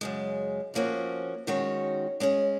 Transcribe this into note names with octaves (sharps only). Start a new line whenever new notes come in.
F#2 C#3 G#3
F2 F3 A#3 C#4 F#4
D#3 G#3 C#4 F#4 C#5
G#3 C#4 G#4